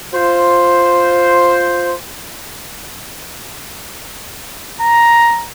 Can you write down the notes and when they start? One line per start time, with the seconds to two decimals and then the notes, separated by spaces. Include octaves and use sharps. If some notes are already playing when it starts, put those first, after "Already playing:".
0.14 F4 C5
4.81 A#5